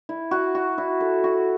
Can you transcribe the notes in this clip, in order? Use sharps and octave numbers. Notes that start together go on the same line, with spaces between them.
E4
F#4
F#4
E4
A4
F#4